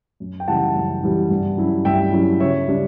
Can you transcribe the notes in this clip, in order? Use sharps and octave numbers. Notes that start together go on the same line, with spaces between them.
F#2
G5
C#3 E3 G3 F#5 A5
F#2
C#3 E3 G3
G2
F#3 C#4 E4
G2 E5 G5
F#3 C#4 E4
C#3 C#5 E5
G3 D4